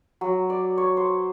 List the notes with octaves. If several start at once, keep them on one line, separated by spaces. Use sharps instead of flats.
F#3
D5
C#5
C5